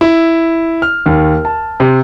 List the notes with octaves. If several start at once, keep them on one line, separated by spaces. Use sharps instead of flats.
E4
F6
D#2
A5
C3